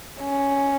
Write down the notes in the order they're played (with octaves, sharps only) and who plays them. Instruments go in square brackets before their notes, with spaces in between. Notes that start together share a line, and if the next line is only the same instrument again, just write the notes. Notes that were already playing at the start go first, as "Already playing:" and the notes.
[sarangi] C#4